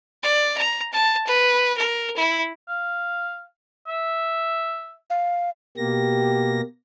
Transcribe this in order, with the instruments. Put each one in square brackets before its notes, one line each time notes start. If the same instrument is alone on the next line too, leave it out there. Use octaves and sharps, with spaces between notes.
[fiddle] D5
A#5
A5
B4
A#4
E4
[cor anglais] F5
E5
[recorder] F5
[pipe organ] B2 A#3 A#6 [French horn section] G4